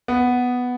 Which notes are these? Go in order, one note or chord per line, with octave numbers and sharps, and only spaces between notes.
B3